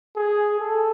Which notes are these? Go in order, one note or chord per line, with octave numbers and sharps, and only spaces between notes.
G#4
A4